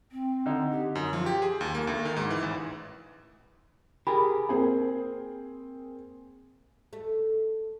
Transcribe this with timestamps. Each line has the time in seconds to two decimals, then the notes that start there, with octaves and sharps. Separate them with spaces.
0.12 C4
0.46 D3 D#4
0.71 G4
0.95 F#2
1.13 F3
1.26 G4
1.42 G#4
1.61 D#2
1.75 A#3
1.87 D2
2.05 D#3
2.16 G#2
2.30 E3
2.43 A1
4.07 G4 G#4 A#4 B5
4.49 A#3 C4 G#4
6.93 A3